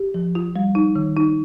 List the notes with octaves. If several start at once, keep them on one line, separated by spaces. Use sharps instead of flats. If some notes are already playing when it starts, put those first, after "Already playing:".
Already playing: G4
F3
F4
G3
D#4
D#3
D#4